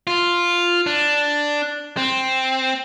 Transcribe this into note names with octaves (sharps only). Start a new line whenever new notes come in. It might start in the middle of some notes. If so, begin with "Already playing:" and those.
F4
D4
C4